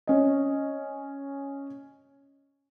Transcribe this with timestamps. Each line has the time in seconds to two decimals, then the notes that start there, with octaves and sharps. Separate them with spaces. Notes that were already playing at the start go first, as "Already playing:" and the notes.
0.07 C#4 D#5